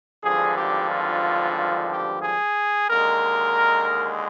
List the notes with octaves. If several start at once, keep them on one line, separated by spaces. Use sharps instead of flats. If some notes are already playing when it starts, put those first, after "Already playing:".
G#1 G2 D3 F3 G#4
G4
F4
F4
G4
G#4
D#2 D3 G#3 A#4